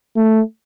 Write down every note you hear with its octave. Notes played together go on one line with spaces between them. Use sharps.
A3